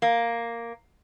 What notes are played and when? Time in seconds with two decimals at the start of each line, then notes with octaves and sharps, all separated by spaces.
0.02 A#3